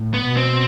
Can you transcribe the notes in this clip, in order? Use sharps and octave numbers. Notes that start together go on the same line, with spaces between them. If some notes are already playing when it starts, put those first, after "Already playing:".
Already playing: A2
B3
B2
C4